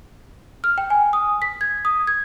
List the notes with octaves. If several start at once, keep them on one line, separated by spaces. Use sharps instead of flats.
F6
G5
G#5
D#6
B6
G#6
D#6
G#6